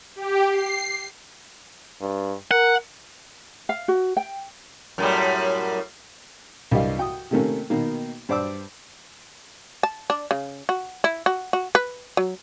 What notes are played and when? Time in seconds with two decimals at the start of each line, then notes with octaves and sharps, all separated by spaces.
0.16 G4
0.51 C7
2.01 G2
2.51 A#4 F#5
3.69 F5
3.88 F#4
4.17 G5
4.98 F#2 A2 G3
6.71 C2 G2 G4 D#5 F5
6.97 F#4 G5 D#6
7.31 C3 D#3 A3 A#3 C#4
7.70 B2 D#3 A#3
8.29 G2 C5 D5 D6 E6
9.83 A5
10.10 D4
10.31 C#3
10.69 F#4
11.04 E4
11.26 F#4
11.53 F#4
11.75 B4
12.17 F#3